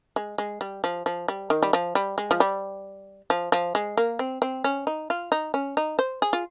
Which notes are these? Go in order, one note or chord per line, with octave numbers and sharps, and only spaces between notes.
G#3
G#3
G3
F3
F3
G3
D#3
G3
F3
G3
G#3
F3
G3
F3
F3
G#3
A#3
C4
C4
C#4
D#4
F4
D#4
C#4
D#4
C5
G#4
F4